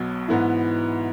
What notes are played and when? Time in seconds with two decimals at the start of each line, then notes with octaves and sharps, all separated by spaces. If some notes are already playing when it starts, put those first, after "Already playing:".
Already playing: B1 B2 F#3
0.28 G#2 E3 B3 E4